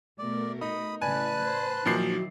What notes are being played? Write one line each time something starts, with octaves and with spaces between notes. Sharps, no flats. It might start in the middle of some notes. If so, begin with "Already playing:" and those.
B2 A3 A#4 D5
D#4 B5 D#6
A2 C#3 E3 B4 D5 G#5 A5 F#6
C5
A#2 D#3 F3 F#3 E4 F#4 C7